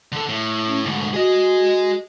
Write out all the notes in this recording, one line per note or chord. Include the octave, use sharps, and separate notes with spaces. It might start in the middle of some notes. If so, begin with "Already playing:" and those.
D3 A4
A2
C#4
D2 G#2 D3
F#4 G#4 D#5